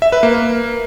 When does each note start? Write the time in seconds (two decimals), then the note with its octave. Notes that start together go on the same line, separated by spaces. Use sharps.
0.02 E5
0.12 B4
0.23 A#3